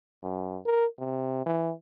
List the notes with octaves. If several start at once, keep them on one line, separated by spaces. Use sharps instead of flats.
F#2
A#4
C3
E3